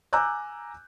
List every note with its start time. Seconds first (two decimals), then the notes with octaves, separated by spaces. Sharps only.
0.13 G#5 A#5 D6 E6 F#6 G6